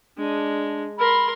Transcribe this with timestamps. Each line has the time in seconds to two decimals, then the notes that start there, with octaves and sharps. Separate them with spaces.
0.17 G#3 D4
0.98 A#4 B5 C6